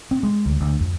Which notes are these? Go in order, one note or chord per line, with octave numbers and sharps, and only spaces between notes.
C4
G#3
D2
D2
F2